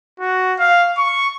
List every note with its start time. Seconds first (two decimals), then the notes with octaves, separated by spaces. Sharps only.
0.20 F#4
0.59 F5
0.97 C#6